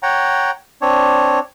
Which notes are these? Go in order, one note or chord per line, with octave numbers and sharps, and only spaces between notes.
C#5 F#5 G5 A#5
C4 D4 C#5